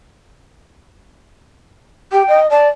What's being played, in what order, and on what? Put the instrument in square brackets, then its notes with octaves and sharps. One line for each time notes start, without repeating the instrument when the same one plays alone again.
[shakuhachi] G4 [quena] G5
[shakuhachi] D#5
[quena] D5 [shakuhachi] A5